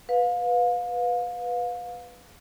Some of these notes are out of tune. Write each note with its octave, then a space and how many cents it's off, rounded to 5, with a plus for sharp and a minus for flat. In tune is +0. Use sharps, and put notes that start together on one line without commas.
B4 +0 F5 +30